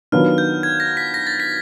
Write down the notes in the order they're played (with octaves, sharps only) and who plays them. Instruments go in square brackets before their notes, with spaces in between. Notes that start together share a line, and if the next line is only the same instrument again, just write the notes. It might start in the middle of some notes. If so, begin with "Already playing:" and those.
[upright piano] D#3 F#3 B3 D4 F4 [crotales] F6
[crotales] G6
G#6
A#6
B6
A#6
A6
B6